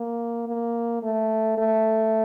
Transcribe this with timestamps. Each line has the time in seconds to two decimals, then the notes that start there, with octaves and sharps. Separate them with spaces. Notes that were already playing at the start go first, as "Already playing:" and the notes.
Already playing: A#3
0.47 A#3
1.03 A3
1.58 A3